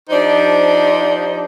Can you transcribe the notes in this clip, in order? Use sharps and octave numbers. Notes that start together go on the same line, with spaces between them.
F3 D4 D#4 G4 C5